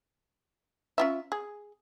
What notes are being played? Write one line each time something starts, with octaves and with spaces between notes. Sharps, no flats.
C#4 F4 E5
G#4